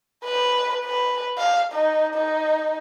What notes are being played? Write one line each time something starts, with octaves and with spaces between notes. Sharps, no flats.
B4
B4
F5
D#4
D#4